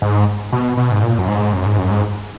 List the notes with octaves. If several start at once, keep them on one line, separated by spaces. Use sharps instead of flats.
G#2
B2
B2
G#2
A#2
F#2
G#2
F#2
G#2
F#2
G#2